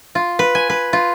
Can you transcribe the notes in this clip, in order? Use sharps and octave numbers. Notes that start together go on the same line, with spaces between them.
F4
B4
G#5
B4
F4